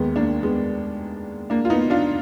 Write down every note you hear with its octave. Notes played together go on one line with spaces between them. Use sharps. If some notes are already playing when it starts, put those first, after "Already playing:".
Already playing: D#2 D#3 G#3 B3
A#3 D4
G#3 B3
A#3 D4
F4
B3 D#4
D4 F4